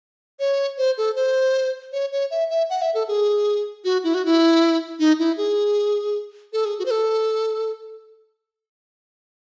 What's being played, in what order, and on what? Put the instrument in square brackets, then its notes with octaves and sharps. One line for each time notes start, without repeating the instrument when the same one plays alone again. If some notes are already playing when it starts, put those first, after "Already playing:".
[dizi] C#5
C5
A4
C5
C#5
C#5
E5
E5
F#5
E5
A4
G#4
F#4
E4
F#4
E4
D#4
E4
G#4
A4
G#4
F#4
C5
A4